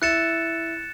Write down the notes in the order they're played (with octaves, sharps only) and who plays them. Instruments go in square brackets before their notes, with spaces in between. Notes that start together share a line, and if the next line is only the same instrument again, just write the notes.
[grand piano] E4 [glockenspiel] F#6 A6 C#7 E7